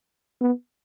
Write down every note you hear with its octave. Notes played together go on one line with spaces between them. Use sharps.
B3